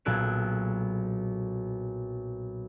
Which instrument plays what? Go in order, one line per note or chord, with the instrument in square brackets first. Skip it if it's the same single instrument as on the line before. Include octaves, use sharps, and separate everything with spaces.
[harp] B1 A#2 G#4 A4 F#6 D7